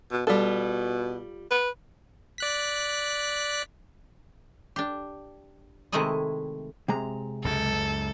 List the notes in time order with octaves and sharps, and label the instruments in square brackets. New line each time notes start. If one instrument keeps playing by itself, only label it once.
[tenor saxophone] B2
[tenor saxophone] B2 [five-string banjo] G3 F4 A4
[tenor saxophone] B4
[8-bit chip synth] D5 F#6 B6
[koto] D4 G4
C3 D#3 G#3 A3 E4 G#4
[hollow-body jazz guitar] C3 G#3 A#5
[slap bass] C#2 F#2 [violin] A4